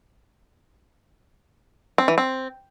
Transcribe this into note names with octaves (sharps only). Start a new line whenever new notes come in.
C4
E3
C4